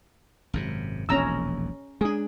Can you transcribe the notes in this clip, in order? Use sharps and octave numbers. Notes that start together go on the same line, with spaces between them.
G#1 F#2 C3
E1 A#1 D#2 C#4 A#5 E6
G#3 D4 G#4